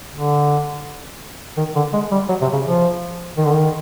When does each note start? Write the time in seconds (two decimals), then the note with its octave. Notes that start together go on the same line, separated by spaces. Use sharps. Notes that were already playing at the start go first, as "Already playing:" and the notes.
0.13 D3
1.57 D#3
1.76 D3
1.93 G#3
2.11 G3
2.29 F#3
2.42 C3
2.53 C#3
2.65 F3
3.37 D#3
3.45 D3
3.52 D#3